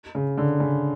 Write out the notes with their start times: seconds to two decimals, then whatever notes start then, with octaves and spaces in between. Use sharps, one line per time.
0.15 C#3
0.38 D3
0.60 C#3